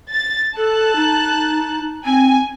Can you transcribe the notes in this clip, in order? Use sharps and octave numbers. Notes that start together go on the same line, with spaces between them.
A6
A4 A5 F#6
D#4
C4 G#5